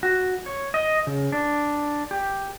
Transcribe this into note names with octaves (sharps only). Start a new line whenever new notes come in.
F#4
C#5
D#5
C#3
D4
G4